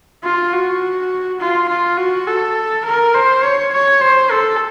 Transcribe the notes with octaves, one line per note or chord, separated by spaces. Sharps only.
F4
F#4
F4
F4
F#4
A4
A#4
C5
C#5
C#5
C5
A4